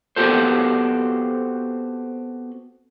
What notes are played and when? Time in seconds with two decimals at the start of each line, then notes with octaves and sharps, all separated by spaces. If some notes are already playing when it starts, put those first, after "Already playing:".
0.16 B3 C4 F#4 G4 A4 C5